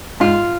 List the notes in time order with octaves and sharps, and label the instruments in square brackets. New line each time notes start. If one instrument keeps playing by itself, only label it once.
[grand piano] G#2 [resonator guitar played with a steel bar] F4